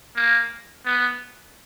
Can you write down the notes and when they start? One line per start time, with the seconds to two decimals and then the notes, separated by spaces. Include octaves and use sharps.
0.16 A#3
0.85 B3